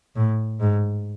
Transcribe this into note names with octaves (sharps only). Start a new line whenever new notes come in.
A2
G#2